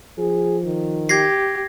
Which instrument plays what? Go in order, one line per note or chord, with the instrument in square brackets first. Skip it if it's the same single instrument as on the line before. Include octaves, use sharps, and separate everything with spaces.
[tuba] F3 [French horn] G#4
[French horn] D#3
[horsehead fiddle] G4 [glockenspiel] G#6 A#6 C7